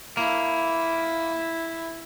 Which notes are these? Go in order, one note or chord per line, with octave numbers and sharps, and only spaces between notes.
A#3 E4